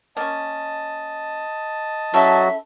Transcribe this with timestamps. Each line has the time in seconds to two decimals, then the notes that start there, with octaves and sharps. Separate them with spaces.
0.17 A#3 C#4 D#5 A5
2.14 C#3 F#3 E4 F#4 A4 E5